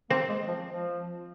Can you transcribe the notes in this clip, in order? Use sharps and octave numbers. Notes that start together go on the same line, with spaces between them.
A#3 C4
G#3
F3
F3